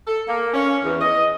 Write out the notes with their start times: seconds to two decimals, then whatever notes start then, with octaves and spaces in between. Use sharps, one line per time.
0.07 A4
0.28 A#3
0.54 C#4
0.84 E2
1.00 D#5